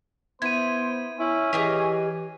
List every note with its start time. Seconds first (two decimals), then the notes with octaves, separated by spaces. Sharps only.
0.42 B3 E4 C5 G#6 D#7
1.19 C#4 E4
1.53 E3 G4 G#4 D#5